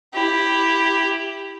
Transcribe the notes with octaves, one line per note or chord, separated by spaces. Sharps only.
E4 G4